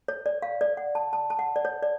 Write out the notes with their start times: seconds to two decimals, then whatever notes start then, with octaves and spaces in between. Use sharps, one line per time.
0.08 C#5
0.26 D5
0.42 F5
0.61 D5
0.77 F#5
0.95 A5
1.13 A5
1.30 A5
1.39 F#5
1.56 D5
1.65 C#5
1.83 D5